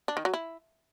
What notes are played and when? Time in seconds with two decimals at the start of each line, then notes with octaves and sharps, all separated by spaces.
0.08 D4
0.17 D#3
0.25 F#3
0.34 E4